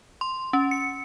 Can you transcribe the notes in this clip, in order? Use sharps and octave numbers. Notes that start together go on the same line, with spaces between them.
C6
C#4
C#7